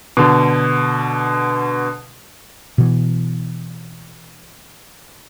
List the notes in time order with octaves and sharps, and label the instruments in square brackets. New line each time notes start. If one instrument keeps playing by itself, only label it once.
[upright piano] B2 D3
[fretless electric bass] B2 E3